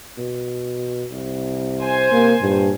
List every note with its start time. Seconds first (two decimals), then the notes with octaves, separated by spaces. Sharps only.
0.18 B2
1.11 C2
1.81 C5 G#5
2.12 C3 A#3
2.41 G2 A#2